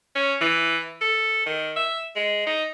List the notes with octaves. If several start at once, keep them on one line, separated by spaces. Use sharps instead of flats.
C#4
E3
A4
D#3
E5
G#3
D#4